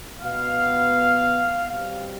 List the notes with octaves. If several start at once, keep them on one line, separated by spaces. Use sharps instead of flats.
B2 B3 F5
B2 G3 C4 F5